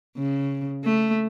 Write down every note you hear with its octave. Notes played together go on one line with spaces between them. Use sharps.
C#3
A3